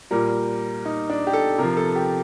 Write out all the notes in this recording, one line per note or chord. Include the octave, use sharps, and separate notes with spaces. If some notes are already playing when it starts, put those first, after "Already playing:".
A#2 G3 A#4
D#4
D4
G4
A4
C3 F3 A#4
A4
G4